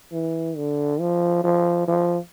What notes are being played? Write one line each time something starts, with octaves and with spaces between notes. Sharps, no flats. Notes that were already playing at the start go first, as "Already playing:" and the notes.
E3
D3
F3
F3
F3